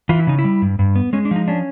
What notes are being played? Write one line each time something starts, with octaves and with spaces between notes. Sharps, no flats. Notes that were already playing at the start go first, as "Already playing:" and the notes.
E3 F4
E4
C#3 D#4
E4
G3
G2
G2
B3
G#3 C#4
D4
F3 D#4
C#4 D4